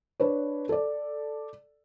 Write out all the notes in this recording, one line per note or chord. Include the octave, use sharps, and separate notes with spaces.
D4 B4 C#5
A4 D5